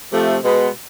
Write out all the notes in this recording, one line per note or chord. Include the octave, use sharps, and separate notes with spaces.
C3 F3 A3
B2 G#3 B3